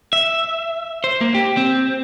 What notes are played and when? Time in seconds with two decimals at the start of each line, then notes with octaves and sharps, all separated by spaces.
0.13 E5
1.04 C5
1.21 A#3
1.34 G4
1.57 C4